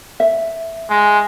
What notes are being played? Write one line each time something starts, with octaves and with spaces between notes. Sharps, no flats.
E5
G#3